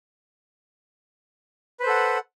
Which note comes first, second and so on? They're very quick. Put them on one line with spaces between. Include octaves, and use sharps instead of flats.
B4 C5 A4 F#5